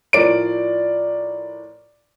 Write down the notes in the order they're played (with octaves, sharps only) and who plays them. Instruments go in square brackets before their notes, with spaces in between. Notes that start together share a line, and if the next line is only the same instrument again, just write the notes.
[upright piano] A2 F3 A#4 D5 D7